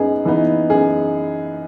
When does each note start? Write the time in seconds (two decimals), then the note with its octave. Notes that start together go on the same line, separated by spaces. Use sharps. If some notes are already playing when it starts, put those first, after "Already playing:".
Already playing: F#2 B3 D#4 G#4
0.25 E3 B3 D#4
0.70 F#2 G#4